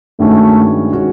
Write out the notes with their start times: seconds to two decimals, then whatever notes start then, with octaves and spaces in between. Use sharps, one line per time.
0.19 G2 D#3 G#3 A3 C#4 F#4
0.93 D#3 G#3 C#4 F#4